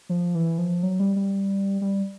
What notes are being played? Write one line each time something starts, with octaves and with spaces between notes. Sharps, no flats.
F3
E3
F3
F#3
G3
G3
G3